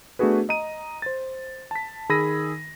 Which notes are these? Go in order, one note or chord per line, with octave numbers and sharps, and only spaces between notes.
A3 B3 D4 F#4 G#4 B4
D#5 A#5 D#7
C5 A6
A5 B6
D#3 G#4 B5 E6 A#6 D#7